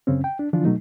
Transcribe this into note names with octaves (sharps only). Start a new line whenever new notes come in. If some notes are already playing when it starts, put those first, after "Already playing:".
F#2 C#3 C4 C#4
G5
D4
D3 E3 F3 D4 F4
B2 F#3 A3 D#4